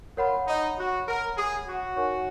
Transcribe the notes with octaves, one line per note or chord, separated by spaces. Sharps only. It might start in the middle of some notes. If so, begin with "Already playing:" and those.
F4 A#4 C#5 F#5 B5
D#4
F#4
A#4
G#4
F#4
D#4 A#4 C#5 G#5 C#6